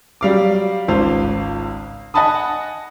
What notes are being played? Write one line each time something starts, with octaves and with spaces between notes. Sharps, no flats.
F#3 G3 F5 D6
G#1 C#2 F4 C5 F5
D#5 F#5 G#5 A5 B5 D#6